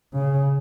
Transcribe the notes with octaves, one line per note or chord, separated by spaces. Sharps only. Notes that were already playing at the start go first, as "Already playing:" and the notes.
C#3